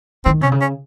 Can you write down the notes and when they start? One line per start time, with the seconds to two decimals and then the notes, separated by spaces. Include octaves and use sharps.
0.25 D#3 C4
0.41 C3 C#4
0.52 C#3
0.61 C#4